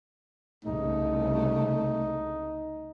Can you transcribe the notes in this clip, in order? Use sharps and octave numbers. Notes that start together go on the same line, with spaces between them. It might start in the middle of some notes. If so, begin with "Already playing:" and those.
C2 C#3 A3 D#4